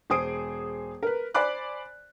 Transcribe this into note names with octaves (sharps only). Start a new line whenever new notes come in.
E1 G#4 C5 D#6 D7
A#4 B4
C5 D5 G#5 B5 D6 F#6